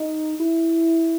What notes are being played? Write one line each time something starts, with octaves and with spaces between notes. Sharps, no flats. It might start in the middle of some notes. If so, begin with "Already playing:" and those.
Already playing: D#4
E4